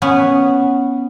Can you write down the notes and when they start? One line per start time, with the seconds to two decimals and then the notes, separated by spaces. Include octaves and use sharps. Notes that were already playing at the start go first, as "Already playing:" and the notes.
0.02 B3 C#4